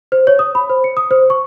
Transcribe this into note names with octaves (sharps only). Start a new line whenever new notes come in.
C5
C#5
D#6
B5
C5
C#7
D#6
C5
C#6